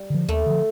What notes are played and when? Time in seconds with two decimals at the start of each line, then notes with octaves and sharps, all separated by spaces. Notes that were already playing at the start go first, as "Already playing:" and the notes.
Already playing: G3
0.10 D3 F3
0.28 D#2 A3
0.46 D3 F3